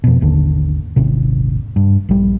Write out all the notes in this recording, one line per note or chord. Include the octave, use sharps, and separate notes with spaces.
F2 B2
G#1 D#2 D3
D#1 G#1 C3
G2
A#1 G3